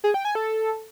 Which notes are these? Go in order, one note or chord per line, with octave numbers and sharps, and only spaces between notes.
G#4
G5
G#5
A4